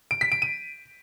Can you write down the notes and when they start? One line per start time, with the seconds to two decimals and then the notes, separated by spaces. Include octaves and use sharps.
0.11 D7
0.21 B6
0.32 D7
0.42 D#7